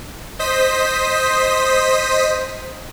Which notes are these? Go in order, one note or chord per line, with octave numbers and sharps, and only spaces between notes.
C5 D#5 D#6 B6